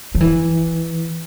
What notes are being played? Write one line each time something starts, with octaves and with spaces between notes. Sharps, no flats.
F3
E3